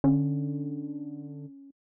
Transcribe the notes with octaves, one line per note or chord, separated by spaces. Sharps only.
D3 C#4